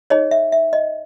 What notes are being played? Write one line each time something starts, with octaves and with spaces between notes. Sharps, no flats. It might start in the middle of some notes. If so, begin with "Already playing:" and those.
D#4 G#4 C#5 D#5
E5
E5
D#5